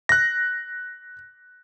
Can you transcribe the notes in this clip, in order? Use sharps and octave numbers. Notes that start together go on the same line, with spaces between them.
F#6 A#6